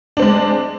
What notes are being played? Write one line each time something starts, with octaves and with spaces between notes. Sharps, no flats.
G#3 C4 D4